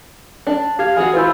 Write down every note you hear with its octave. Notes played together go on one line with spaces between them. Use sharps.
D4
G4 F5 G#6
E3 F#4 G#4
E4 F4 B4 C5